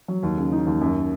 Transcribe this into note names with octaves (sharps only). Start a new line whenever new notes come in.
F#3
D#2
C#3
D#4
D#2
F#2